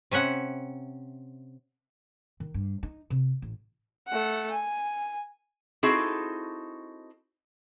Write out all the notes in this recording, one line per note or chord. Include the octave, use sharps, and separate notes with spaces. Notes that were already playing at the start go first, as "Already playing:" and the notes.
C3 C#4 E5 F#5
D#3
G2
D#4
C3
A1
A3 F#5
G#5
C4 D#4 E4 F#4 G#4 A4